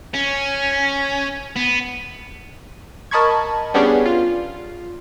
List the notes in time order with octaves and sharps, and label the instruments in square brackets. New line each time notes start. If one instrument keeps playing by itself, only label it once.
[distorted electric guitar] C#4
B3
[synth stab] A#4 D#5 A5 B5 C#6 G#6
G3 B3 C#4 D4 G4 G#4
F4